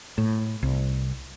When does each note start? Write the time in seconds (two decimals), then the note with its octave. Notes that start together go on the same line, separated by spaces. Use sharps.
0.18 A2
0.63 C2